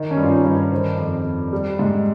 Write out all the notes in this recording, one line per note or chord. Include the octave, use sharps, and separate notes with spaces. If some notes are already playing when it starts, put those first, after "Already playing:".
Already playing: D#3
C#4
G2
F4
D#4
G2
C#5
D#3 C5
F2
F2
G3
G#2